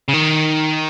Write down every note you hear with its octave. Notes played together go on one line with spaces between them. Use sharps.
C#3
D#3